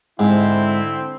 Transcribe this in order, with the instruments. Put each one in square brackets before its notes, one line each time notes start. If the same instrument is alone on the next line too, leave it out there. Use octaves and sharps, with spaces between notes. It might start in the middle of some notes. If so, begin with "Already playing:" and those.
[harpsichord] G#2 [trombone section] D3 C4 E4